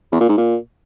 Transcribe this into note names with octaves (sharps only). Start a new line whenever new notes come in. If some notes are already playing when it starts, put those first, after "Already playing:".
E2
A#2
G#2
A#2